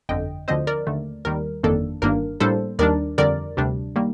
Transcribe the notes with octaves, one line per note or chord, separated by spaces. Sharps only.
G1 F2 D3 D#5 G5
D2 D3 F3 C4 C5 D#5
A#4 D5
D#2 D3 A3
D#2 D#3 G3 A#4
G1 F2 D#3 A#3 D4 A4
G1 G2 D#3 A#3 D4 A#4
A2 G3 A#3 D4 A4 C5
D#2 D#3 G3 D4 A#4 D5
F2 D3 G3 A#4 D5
D2 C3 G3 D4
D#3 G3 A#3